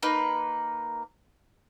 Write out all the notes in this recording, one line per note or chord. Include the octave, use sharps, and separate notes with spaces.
A#3 D#4 B4